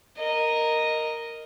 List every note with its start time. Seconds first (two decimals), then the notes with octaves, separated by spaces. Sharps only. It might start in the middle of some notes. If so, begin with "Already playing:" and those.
0.17 A#4 D#5